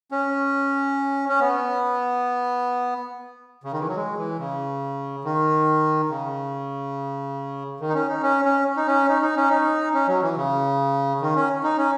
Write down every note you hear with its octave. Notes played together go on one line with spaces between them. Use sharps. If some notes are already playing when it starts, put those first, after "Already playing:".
C#4
C#4
B3
C#3
D#3
E3
F#3
G#3
E3
C#3
D#3
C#3
D#3
D#4
C#4
D#4
C#4
C#4
D#4
C#4
D#4
D#4
C#4
D#4
C#4
F#3
E3
C#3
D#3
C#4
D#4
C#4